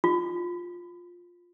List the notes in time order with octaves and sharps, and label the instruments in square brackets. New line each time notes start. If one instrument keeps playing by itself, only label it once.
[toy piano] F4